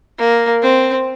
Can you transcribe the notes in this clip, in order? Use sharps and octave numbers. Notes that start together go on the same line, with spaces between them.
A#3
C4